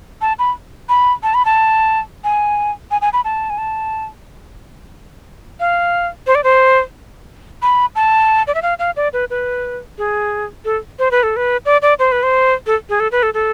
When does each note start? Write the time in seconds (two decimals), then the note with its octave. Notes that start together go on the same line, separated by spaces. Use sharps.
0.21 A5
0.39 B5
0.89 B5
1.23 A5
1.34 B5
1.45 A5
2.24 G#5
2.91 G#5
3.01 G#5
3.13 B5
3.25 A5
3.50 G#5
3.58 A5
5.60 F5
6.27 C5
6.35 D5
6.44 C5
7.62 B5
7.95 A5
8.47 D5
8.55 E5
8.62 F5
8.79 F5
8.97 D5
9.13 B4
9.30 B4
9.98 G#4
10.65 A4
10.99 C5
11.11 B4
11.23 A4
11.36 B4
11.66 D5
11.82 D5
11.99 C5
12.12 B4
12.23 C5
12.67 A4
12.89 G#4
13.00 A4
13.12 B4
13.23 A4
13.34 A4